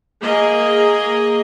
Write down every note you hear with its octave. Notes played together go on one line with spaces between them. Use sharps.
A#3 G#4 D#5 G#5